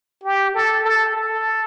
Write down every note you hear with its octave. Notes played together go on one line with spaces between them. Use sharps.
G4
A4
A4
A4